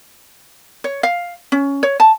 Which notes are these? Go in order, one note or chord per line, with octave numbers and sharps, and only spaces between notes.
C#5
F5
C#4
C#5
A5